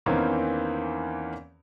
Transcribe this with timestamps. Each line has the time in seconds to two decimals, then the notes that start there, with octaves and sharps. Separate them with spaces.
0.06 E2 D#3 E3 A#3 C4 C#4